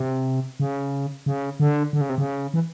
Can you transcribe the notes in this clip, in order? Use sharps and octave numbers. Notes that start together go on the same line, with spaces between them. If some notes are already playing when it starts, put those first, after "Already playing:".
Already playing: C3
C#3
C#3
D3
D3
C#3
C3
C#3
E3